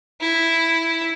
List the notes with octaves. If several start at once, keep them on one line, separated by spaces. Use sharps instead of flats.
E4